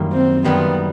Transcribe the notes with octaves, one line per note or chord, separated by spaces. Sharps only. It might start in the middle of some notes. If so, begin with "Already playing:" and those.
Already playing: F#2 D#3 G3 A#3
C4
F#2 D#3 G3 A#3 B3